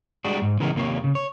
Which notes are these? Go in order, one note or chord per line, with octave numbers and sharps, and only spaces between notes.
G3 G#3 D4 F#4
G#2
C#3 E3 G#3 B3 A#4
D#2 C3 A#3 F4 C#5
C#3
C#5